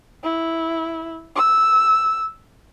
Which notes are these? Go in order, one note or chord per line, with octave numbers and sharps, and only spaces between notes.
E4
E6